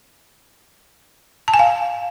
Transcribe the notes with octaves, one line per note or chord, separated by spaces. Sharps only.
A5
G#5
F5